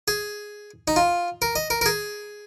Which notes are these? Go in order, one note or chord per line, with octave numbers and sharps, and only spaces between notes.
G#4
D#4
F4
A#4
D#5
A#4
A#4
G#4